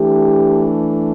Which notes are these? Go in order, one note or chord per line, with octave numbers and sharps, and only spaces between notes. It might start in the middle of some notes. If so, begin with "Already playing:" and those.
Already playing: E3 A3 D4 G4